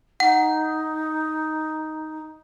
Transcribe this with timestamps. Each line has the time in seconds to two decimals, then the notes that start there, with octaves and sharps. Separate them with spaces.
0.20 D#4 F#5